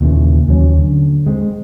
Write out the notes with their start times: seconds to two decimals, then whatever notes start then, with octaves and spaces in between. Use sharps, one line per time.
0.01 D#2 A#2 C#3 E3
0.47 D#2 F#3 C#4
0.79 D3
1.27 G#3 C4